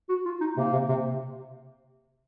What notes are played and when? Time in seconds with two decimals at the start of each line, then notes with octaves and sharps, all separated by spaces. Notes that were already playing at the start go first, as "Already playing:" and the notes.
0.09 F#4
0.25 F4
0.41 D#4
0.57 C3 A#3
0.73 C3
0.89 C3